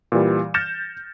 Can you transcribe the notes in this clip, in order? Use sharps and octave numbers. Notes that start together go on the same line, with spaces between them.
A#2 E3 G3
F6 G6 A6 A#6 C#7 E7